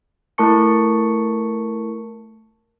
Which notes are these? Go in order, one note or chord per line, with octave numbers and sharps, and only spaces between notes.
A3 E4 A#4 A5 C#6 C#7